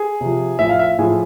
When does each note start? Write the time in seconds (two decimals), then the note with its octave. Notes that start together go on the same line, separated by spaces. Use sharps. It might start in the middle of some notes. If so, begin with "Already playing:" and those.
Already playing: G#4
0.21 C3 F3
0.59 A2 F3 E5
0.69 F5
0.79 E5
0.99 A2 F3 G#4